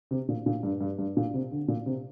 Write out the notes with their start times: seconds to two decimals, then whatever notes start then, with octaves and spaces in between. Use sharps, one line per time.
0.11 C3
0.29 A#2
0.46 A#2
0.63 G2
0.81 G2
0.99 G2
1.17 A#2
1.34 C3
1.51 D3
1.68 A#2
1.86 C3